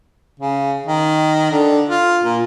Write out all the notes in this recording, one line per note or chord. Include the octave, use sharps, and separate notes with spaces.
C#3
D#3
D3
F4
A#2